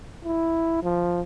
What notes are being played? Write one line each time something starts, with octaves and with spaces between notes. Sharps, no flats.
E4
F3